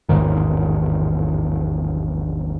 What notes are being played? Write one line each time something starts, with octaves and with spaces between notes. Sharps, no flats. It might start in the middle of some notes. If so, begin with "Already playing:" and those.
A1 E2 G#2 D#3